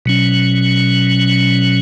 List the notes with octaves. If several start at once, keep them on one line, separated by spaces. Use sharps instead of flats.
B2 F#3 C#4